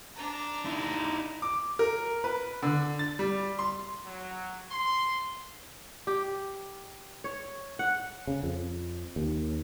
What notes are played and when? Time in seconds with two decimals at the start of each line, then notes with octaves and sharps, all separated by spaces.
0.16 D4 A#5
0.65 D#4 E4
1.42 D6
1.79 A#4
2.24 B4
2.63 D3
2.99 A6
3.19 G3
3.59 C6
4.06 F#3
4.70 C6
6.07 G4
7.24 C#5
7.79 F#5
8.27 C#3
8.43 F2
9.16 D#2